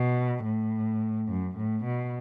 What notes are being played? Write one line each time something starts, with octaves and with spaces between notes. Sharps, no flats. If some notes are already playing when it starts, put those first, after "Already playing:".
Already playing: B2
A2
F#2
A2
B2